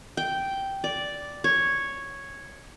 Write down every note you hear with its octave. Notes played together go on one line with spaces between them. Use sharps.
G5
D5
C#5